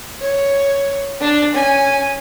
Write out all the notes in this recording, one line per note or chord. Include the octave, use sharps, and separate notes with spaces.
C#5
D4
C#4 G#5